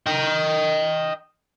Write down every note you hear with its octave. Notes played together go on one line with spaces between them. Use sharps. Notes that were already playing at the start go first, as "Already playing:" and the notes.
D#5 G5